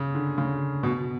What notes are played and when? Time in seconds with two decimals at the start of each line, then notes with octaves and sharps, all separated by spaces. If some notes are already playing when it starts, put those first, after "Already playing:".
Already playing: C#3
0.15 D3
0.38 C#3
0.83 B2